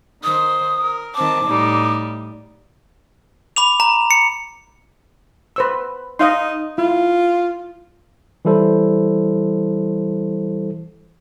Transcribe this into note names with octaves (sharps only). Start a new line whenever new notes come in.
D#3 C5 D#6
A#4
D#3 C4 A5 D6
A2 G3 D#4
B5 D6 F7
A#5
C#7
B4 C5 E6
D#4 D#5 F5 C6
E4 F4
E3 G3 E4 A4 C5